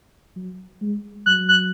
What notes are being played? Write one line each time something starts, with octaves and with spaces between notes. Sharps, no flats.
F#3
G#3
F#3 F#6
F#6